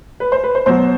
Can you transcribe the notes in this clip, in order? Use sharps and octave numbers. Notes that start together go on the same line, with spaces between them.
B4
C5
B4
C5
B2 F#3 C5